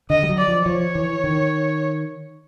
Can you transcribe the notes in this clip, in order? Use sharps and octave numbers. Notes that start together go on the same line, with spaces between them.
D3 D#5
G3
F#3
D5
F3
F3 C#5
E3
D#3